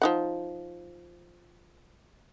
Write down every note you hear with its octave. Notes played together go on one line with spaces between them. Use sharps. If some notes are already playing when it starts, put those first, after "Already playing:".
F3 D#4 F#5